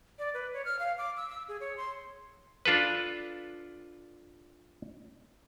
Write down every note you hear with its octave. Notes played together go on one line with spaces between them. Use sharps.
D5
B4
C#5
F6
F5
D6
E6
E6
G#4
C#5
C6
D4 F4 A4 B4